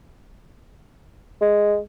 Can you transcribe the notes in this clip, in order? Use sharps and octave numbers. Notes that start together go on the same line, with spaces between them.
G#3